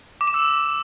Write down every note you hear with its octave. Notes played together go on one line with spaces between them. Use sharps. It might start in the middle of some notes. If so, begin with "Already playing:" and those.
D6
E7
E6